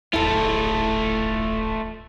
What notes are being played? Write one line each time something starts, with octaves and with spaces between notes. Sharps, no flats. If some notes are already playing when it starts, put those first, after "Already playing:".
D1 G#1 A3 E4 F4 A4